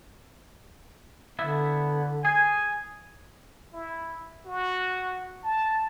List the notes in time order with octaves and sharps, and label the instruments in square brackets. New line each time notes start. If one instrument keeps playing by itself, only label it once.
[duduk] D3 [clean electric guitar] B3 E4 E5
[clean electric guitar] G#4 [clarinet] G#5
[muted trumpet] E4
F#4
A5